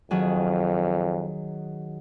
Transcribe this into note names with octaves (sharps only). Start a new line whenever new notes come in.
F2 D#3 F#3 G#4